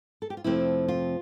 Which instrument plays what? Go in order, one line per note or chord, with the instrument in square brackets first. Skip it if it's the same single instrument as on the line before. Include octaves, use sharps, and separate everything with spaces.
[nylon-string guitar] A4
G4
F4
F2 C3 F3 A3 C4 E4
F4